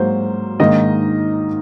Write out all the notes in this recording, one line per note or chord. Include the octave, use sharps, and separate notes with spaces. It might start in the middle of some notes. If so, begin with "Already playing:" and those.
Already playing: G#2 F#3 A#3 C5
G#2 D#3 A#3 D#4 D#5